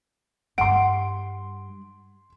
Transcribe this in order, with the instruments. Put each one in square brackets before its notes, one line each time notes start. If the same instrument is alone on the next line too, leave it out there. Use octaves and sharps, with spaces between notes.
[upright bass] G2 G3 [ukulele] F#5 [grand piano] C6 D7